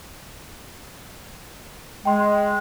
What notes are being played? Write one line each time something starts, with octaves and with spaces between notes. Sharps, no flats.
G#3 G5 C6